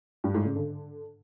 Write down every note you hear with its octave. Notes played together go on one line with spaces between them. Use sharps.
G2
G#2
C#3
D3